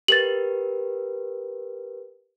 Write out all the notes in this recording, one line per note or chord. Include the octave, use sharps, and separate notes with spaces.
G4 A#4 B4 A6 F#7